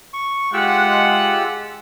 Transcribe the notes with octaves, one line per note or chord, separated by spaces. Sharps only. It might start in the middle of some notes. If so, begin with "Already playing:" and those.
C#6
G#3 F4 G4 F#5 E6